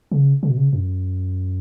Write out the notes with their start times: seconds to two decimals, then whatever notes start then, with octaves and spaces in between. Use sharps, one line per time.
0.12 C#3
0.43 C#3
0.49 B2
0.57 C#3
0.73 F#2